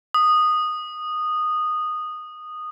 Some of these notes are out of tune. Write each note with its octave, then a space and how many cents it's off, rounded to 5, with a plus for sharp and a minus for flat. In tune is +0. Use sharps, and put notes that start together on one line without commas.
D#6 -10